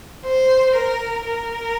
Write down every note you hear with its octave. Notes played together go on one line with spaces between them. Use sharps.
C5
A#4
A#4